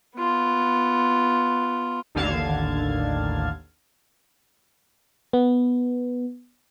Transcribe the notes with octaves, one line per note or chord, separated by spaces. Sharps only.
B3 F4
A1 D#2 D3 F5 A5 G#6
B3